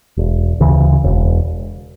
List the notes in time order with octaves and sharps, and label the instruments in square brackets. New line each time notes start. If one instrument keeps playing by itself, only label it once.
[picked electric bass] E1
D2 C#3 E3
E1